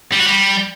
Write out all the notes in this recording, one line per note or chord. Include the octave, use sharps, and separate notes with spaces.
G3
F#4
G3